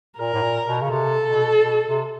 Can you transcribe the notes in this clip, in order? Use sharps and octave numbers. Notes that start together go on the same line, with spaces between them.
A#2 A#4
A2
A#2
B2
C#3
C3 A4
B2
B2
C3